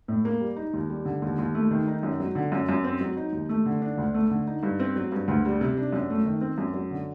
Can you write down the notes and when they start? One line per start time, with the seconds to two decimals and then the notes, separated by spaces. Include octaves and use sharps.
0.08 A2
0.25 A#3
0.40 G3
0.56 D#4
0.74 D#2
0.89 G3
1.05 D3
1.22 D#2
1.39 D#2
1.55 A3
1.71 D#3
1.87 D#4
2.03 F#2
2.20 F#3
2.35 D3
2.52 F#2
2.69 F#2
2.84 C4
3.01 F#3
3.17 D#4
3.33 D#2
3.49 A3
3.66 D3
3.82 D4
3.97 D2
4.14 A3
4.31 D3
4.47 D#4
4.63 G2
4.80 C4
4.96 F#3
5.12 G2
5.28 D2
5.45 G3
5.61 C3
5.77 D4
5.92 F#2
6.10 A3
6.25 D#3
6.41 C4
6.58 F#2
6.74 F#3
6.91 D3